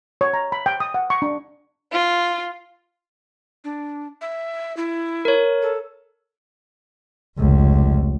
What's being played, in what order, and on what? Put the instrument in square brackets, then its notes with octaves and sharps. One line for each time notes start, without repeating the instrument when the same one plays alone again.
[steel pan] C#5
A#5
B5
G5
D#6
F#5
C#6
D4
[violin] F4
[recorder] D4
E5
E4
[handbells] A#4 C#5
[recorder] A4
[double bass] F1 C#2